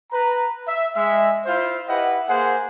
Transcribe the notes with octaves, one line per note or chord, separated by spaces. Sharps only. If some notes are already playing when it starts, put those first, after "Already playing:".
B4 A#5
E5
G#3 E5
E4 F4 C5
E4 G4 B4 D#5 F#5
A#3 G#4 C5 F#5